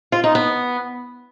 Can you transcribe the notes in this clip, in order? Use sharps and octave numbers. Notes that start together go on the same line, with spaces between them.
F4
D#4
B3